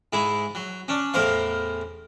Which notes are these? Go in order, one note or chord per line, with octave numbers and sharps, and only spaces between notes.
G#2 E4 G#4
F#3
C#4 D4
E2 A2 A#4 C5 F5